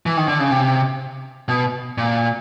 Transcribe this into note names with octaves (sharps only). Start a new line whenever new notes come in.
E3
D#3
D3
C#3
C3
B2
A#2